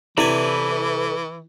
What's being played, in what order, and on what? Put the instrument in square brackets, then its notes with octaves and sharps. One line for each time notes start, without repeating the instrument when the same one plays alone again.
[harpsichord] C3 C4 G#5 [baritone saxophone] E3 [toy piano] E4 [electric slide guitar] A4 B4 D5